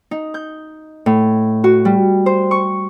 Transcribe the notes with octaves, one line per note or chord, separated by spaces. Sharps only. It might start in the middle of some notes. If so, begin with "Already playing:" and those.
D#4
G6
A2
F#4
G3
C5
C#6